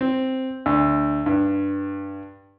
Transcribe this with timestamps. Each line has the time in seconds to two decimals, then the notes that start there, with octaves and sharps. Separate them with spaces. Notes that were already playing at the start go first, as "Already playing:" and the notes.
0.01 C4
0.66 D2
1.26 G2